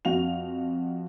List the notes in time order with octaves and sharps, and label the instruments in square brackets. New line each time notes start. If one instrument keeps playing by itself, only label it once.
[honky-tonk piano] F2 F#4 F5 F7